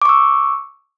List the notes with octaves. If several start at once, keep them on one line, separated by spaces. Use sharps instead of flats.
C#6 D6 E6